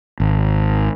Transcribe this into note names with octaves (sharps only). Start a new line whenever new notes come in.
G#1